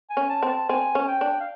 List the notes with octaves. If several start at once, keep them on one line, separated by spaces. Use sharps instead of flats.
G#5
C#4
A5
C4
A5
C4 G#5
C#4
G5
D4
F5